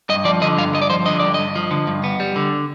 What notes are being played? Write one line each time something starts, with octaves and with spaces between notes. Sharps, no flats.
G2 D#5
F3 D5
D3 D#5
G2 F5
G2 D#5
D5
F3 C5
D3 D#5
G2 D5
G2 D#5
F3
D3
G2
B3
G3
D3